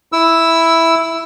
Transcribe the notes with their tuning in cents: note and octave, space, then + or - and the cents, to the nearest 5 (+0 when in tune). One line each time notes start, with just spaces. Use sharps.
E4 +0 E6 +0